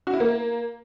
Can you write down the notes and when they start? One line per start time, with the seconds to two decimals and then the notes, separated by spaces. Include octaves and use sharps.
0.07 F#4
0.14 E4
0.20 A#3